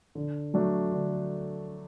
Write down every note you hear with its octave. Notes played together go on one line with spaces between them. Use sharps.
D3
F#3 A3 D4 F#4
D3